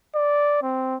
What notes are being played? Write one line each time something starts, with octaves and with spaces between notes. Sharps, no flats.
D5
C4